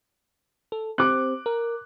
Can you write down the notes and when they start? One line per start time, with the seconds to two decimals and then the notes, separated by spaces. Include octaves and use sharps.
0.72 A4
0.98 C4 G4 C5 D6 F#6
1.46 A#4